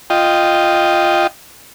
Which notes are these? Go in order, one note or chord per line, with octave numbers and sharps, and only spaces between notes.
F4 D#5 G5